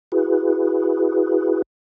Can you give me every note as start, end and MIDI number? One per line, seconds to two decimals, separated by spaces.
0.12 1.62 64
0.12 1.62 66
0.12 1.62 68
0.12 1.62 71